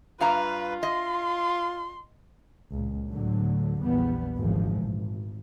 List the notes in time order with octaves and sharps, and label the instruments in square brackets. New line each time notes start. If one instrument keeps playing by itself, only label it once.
[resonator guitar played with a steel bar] G2 F5 A#5 [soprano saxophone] F4 [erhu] B4
[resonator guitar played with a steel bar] D#5 [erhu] C6
[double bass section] C#2 A#2
D2 A2 D3 F#3
A#1 E2 G3 B3
G#1 D2 A#2 E3 F3 G#3
G#1